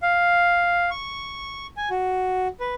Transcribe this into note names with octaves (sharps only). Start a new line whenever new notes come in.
F5
C#6
G#5
F#4
B4